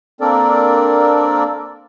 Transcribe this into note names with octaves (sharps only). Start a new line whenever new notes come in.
A#3 C4 D4 A4 A#4 D5